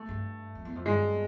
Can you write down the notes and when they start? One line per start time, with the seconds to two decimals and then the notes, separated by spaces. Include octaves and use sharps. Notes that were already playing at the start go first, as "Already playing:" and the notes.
Already playing: A3
0.09 G2
0.55 F2
0.65 E2
0.75 F2
0.85 G2 G#3